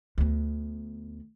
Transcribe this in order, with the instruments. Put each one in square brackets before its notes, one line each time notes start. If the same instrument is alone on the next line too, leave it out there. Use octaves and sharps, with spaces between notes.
[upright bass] D2 B3